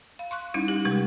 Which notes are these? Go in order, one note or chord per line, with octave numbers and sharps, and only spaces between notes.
F5
C6 C#6 F#6
G3 C#4 D#4 E4
G4
C3 G3 G#3